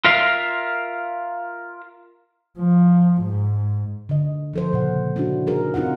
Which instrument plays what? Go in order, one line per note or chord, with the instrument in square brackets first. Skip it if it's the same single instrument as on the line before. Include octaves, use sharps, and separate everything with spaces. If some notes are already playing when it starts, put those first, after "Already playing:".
[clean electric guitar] F4 A#4 E5 F5
[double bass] F3
G#2
[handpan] D3 D#5
F3 A4 C5
A#2 C#3 F#5
C#4 D4 E4 F#4
D#4 G#4 A#4
C4 D#4 F4 A#4 F#5